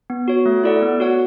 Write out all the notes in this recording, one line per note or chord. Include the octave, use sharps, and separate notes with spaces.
B3
F#4 C#5
A3
E4 A4 D5 F#5
B3
F#4 C#5 F#5